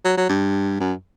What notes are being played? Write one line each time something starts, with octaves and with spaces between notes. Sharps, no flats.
F#3
F#3
G2
F#2